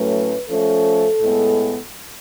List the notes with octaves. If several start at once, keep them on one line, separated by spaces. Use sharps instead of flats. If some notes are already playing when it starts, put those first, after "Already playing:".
Already playing: A2 F#3 A3 C#4 B4
F3 A3 C#4 A4
A2 G#3 B3